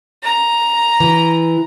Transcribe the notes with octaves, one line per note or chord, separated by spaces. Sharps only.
A#5
E3